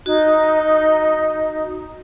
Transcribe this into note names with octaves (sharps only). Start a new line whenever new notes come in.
D#4 F#4